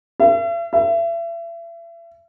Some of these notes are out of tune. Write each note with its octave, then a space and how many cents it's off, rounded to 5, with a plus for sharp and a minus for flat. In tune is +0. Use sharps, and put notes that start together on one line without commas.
E5 +45
E5 +35